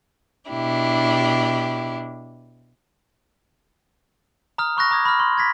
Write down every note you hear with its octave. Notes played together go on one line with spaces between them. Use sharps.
B2 D4 E4 G4
A#5 D#6 F6
B5 C#6 F#6 A#6
A#5 D6 D#6 G#6
B5 F6
C6
G#6 A#6 B6